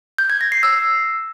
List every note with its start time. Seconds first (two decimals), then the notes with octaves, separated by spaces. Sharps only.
0.18 G6
0.30 G#6
0.41 A#6
0.52 C7
0.63 E6